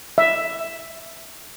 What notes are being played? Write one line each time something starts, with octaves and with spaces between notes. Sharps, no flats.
E5